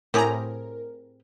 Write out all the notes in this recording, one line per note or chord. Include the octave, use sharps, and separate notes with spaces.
A2 C4 G4 G#4 A#4 A#5